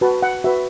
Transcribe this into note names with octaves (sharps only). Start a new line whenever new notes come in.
F#4 B4 A5
F#5
F#4 B4 E5